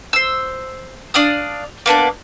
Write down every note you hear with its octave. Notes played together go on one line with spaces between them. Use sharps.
C5 E6
D4 D5 F5 D#6
A#3 B3 D4 D5